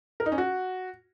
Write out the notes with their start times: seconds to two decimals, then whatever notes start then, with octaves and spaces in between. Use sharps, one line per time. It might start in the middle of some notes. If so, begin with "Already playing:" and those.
0.20 A#4
0.26 D#4
0.32 C#4
0.38 F#4